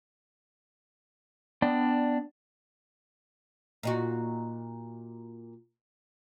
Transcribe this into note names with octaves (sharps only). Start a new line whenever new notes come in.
B3 D4 D5 G5
A#2 D#4 F#4